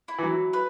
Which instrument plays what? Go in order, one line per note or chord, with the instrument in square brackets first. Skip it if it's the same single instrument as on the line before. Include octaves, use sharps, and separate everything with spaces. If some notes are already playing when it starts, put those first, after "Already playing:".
[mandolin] E4
[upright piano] E3
F#3
[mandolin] B4